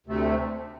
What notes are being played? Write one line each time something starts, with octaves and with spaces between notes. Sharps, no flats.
D2 C3 A3